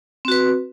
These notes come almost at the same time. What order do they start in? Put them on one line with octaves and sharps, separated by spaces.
C4 F#4 B4